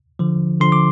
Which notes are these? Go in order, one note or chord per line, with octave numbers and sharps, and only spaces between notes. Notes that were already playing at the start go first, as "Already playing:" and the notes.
D3 F3
D3 F3 C6
D6